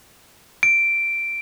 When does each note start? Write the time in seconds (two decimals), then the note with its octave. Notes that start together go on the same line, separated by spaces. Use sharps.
0.63 D7